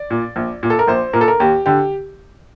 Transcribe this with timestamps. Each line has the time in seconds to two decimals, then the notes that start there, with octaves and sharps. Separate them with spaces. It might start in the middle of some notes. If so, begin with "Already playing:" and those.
Already playing: D5
0.10 A#2
0.36 A#1
0.63 A#2
0.70 A4
0.79 A#4
0.88 A#1 C5
1.13 A#2 A#4
1.21 A4
1.28 A#4
1.40 D#2 G4
1.66 D3 G4